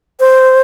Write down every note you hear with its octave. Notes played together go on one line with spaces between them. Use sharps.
C5